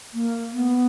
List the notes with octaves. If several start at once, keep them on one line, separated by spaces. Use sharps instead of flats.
A#3
B3